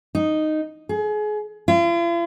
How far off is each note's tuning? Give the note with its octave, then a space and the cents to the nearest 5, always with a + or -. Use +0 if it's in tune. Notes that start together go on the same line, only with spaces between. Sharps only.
D#4 -5
G#4 +30
F4 -45